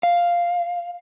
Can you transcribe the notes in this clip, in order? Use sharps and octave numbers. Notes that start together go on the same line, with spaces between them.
F5